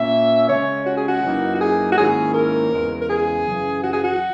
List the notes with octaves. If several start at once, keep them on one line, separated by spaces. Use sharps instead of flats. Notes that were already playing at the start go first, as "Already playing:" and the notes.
Already playing: A#2 A#3 C#4 E5
C#3 G#3 C#4 C#5
F#4
G#4
F#4
F#2 E3 A#3 D#4
F#4
G#4
F#4
G#2 D#3 A#3 C#4 E4 G#4
A#4
E2 C#3 G#3
A#4
G#4
F#2 C#3 E3
F#4
G#4
F#4